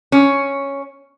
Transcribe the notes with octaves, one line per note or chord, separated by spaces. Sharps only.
C#4